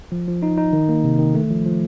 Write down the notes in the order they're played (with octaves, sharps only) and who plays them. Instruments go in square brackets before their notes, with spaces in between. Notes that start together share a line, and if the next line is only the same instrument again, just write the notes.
[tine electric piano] F3
F3
D#4
D#4
D#3
A#3
C3
D#3
A3
F3
F3